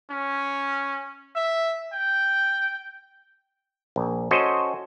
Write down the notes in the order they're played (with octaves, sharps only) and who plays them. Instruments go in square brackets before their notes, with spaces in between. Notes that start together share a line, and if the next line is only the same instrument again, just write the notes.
[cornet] C#4
E5
G5
[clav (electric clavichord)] A#1
C#4 F#4 A4 C5 D#5